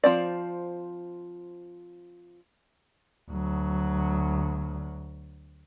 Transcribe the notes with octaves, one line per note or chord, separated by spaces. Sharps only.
F3 C4 D5
D2 F#3